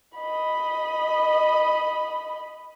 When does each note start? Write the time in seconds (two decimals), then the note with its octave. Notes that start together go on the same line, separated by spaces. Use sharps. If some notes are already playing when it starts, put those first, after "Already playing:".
0.18 D#5 B5